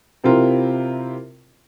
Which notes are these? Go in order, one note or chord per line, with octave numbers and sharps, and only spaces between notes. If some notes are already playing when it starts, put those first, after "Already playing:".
C3 C4 E4 F4 A#4